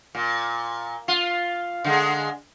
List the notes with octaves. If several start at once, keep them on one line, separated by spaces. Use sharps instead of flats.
A#2
F4
D3 G#3